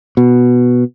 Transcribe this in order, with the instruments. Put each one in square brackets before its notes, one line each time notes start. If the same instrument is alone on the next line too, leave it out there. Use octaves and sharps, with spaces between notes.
[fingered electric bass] B2